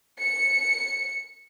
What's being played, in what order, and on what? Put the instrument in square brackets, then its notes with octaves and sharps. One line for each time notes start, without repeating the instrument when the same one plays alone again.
[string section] C#7